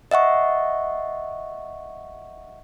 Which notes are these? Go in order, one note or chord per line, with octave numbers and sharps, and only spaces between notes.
D#5 E5 F#5 C#6